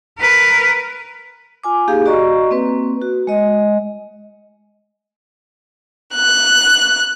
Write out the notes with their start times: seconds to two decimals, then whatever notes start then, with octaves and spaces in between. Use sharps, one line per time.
0.19 A#4 B4
1.64 F4 G#5 D6
1.88 A#3 D#4 G4 G#4 F5
2.06 F#4 D5 D#5 A#5 C#6
2.51 A#3 C4 B4
3.02 F#4
3.27 G#3 D#5
6.15 F#6